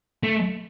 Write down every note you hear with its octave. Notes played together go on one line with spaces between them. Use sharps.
A3